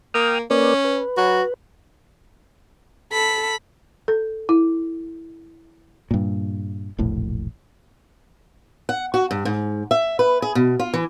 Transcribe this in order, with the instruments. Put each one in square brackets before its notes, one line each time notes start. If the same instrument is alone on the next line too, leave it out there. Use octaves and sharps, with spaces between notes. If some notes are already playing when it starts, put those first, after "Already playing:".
[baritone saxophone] A#3 [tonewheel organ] G5 D#6 F6
[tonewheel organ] A#3 B4 D5 [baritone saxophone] C#4
[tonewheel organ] B4
[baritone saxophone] F#3 [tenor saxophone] F#4
[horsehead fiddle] A4 [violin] B5
[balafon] A4
E4
[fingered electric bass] G2 A#2
E1 A#1 A2
[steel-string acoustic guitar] F#5
F#4
G2
G#2
E5
B4
G#4
B2
F4
E3